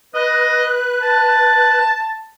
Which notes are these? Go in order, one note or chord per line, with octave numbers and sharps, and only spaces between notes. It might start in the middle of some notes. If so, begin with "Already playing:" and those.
B4 D#5 F#6
A5